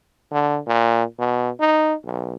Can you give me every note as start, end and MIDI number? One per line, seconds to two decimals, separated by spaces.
0.32 0.60 50
0.67 1.04 46
1.19 1.50 47
1.60 1.94 63
2.05 2.35 35